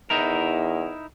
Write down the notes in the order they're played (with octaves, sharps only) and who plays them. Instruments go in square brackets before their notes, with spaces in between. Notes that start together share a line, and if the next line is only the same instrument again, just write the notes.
[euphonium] E2 [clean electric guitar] D#4 E4 A#4